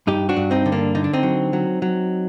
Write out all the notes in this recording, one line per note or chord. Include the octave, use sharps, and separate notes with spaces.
G2 D#4 G4
D4 F#4
G2
C4 D#4
D3
A#3 D4
D3 D#4
D4
C4 D#4
F#3
F#3
F#3